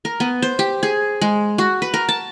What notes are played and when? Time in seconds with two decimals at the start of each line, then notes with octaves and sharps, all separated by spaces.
0.05 A#4
0.20 B3
0.42 C5
0.59 G4
0.83 G#4
1.21 G#3
1.58 F#4
1.82 B4
1.94 A#4
2.09 A5